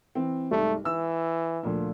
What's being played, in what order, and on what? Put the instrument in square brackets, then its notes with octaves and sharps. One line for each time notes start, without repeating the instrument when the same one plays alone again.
[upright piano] E3 C4
[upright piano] C2 G#2 [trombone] A3
[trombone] E3 [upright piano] E6
[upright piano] D2 A#2 F3